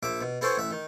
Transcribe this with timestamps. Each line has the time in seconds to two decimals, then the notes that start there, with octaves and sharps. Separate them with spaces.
0.03 A#1 E5 D6
0.21 B2
0.41 B3 E4 G#4 A4 C5 C#5
0.58 A1 E5
0.71 D#3